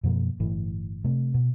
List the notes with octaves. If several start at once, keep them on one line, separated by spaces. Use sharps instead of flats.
F#2 B2 F3 A#3
G1 A2 E3
C3 A3
B2